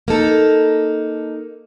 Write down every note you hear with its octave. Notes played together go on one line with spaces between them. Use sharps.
A#3 D#4 A4